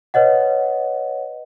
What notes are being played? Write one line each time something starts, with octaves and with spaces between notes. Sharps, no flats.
B4 C#5 D#5 F#5